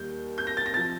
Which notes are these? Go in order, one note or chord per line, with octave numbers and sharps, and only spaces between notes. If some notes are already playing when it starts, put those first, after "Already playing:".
Already playing: D#2 D#3 G3 G6
G6
A#6
A6
A#6
C3 F3 A6